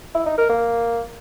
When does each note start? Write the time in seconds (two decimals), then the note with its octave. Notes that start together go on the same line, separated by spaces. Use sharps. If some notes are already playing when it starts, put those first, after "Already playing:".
0.15 E4
0.26 D#4
0.38 A#4
0.49 A#3